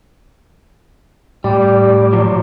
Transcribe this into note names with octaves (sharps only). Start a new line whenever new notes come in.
A2 G3 D5
F3 F#3